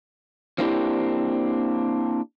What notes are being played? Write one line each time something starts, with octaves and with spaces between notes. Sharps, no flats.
F3 A#3 C4 D4 E4 G4